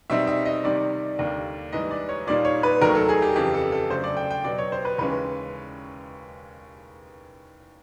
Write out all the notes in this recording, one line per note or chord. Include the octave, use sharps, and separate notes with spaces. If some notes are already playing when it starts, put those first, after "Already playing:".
B2 G3 C4 D#4 E5
E5
D#5
C3 D#3 G3 D5
D#2 D3 G3 A#3
G#2 E3 G3 D#5
D5
C#5
A#2 G3 A#3 D#4 D5
C#5
B4
D#2 D#3 F#3 A3 A#4
A4
G#4
G4
F2 C#3 E3 G4
A4
A4
C#3 F#3 A3 D4 C5
D5
G5
G5
B2 F#3 B3 D5
C#5
C5
B4
D#2 C#3 E3 G#3 C#4 B4